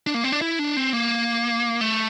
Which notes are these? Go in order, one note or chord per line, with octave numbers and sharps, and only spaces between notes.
D4
A#3
C4
D4
E4
D4
C4
A#3
A3